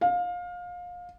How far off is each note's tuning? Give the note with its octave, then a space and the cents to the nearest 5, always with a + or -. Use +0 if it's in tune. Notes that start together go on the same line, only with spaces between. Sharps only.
F5 +25